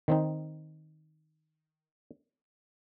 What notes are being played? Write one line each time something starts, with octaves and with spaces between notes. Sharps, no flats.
D#3 C4 D#4